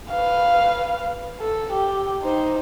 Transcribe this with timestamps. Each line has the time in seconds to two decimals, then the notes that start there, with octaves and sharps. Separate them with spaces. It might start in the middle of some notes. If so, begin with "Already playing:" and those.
0.11 B4 F5
1.40 A4
1.72 G4
2.22 D#4 C5